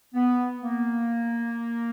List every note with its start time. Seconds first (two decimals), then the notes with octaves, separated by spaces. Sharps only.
0.14 B3
0.61 A#3